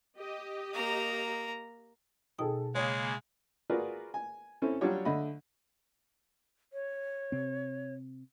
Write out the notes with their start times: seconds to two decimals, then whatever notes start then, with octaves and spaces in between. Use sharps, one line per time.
0.18 G4 D#5
0.74 A#3 A#5
2.38 B2 D#4 G#4 A4 G5 D#6
2.75 C#3 G#3 A#3 C#5 G#5
3.70 F4 F#4 G#4 A#4 B4 D5
4.14 G#5
4.62 C4 C#4 E4 A4
4.81 F#3 G3 D4 F4 G4 C#5
5.05 D3 A3 D#5 B5
6.73 C#5
7.32 C3 C4